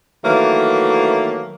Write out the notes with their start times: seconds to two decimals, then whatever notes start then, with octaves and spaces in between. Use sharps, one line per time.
0.24 D#3 E3 F#3 A3 A#3